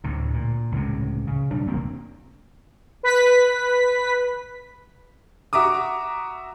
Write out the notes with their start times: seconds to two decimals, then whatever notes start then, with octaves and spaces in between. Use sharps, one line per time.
0.04 D2 A2 C3
0.34 A#2
0.72 C#2 A2 C3
1.27 C#3
1.51 B1 G3 D4
1.67 F#1 E2 A#3 C4
3.03 B4 B6
5.53 F#4 E5 A#5 D6 D#6